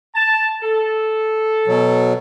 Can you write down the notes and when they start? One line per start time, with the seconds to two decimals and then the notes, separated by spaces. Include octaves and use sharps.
0.15 A5
0.62 A4
1.67 B2 F#3